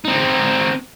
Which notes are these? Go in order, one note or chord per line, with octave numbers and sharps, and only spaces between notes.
C4 D#4